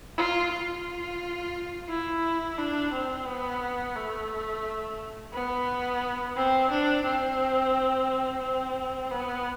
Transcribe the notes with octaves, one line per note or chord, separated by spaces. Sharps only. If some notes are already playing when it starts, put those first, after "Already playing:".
F4
F4
E4
D4
C4
B3
A3
B3
C4
D4
C4
C4
B3